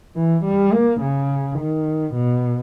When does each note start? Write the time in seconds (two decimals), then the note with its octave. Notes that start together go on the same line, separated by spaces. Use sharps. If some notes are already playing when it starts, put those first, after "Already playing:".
0.16 E3
0.45 G3
0.73 A#3
1.01 C#3
1.59 D#3
2.15 B2